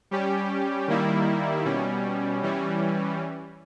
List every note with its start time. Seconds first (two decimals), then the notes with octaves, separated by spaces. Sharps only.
0.11 G3 C#4 G4
0.88 D#3 G3 A#3 E4
1.65 B2 G3 C#4
2.43 E3 G3 C#4